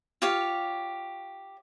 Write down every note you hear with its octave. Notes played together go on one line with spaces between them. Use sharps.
F4 G4 C#5 F5